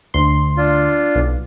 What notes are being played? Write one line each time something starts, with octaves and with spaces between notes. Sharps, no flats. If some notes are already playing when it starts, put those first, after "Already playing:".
D2 C6
D4 F4
B1